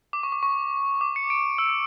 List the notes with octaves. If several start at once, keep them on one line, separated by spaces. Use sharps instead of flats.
D6
C#6
D6
C#6
D6
C#7
D7
E6